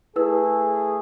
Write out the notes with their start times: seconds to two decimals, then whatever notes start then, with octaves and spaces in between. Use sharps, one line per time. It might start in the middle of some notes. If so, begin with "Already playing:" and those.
0.16 A3 E4 G#4 B4 E6